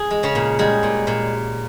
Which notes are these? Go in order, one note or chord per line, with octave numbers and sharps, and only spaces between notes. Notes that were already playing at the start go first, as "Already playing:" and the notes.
Already playing: G#4
G#3
C#3 C#4
A#2
G3 G#3 G#4
A#2
A#2